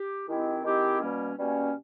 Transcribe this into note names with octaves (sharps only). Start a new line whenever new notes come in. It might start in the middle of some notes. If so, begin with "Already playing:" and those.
Already playing: G4
D#3 G#3 C4 E4 G4
D#3 G#3 C4 E4 G4
B2 G3 A#3 C#4
B2 G3 A#3 C#4